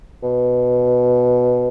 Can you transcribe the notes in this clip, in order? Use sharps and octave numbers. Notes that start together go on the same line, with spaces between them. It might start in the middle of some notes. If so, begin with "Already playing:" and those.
B2